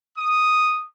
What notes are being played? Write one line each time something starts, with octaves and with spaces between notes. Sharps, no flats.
D#6